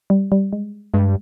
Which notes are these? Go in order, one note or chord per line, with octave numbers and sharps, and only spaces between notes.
G3
G3
G#3
G2 G#3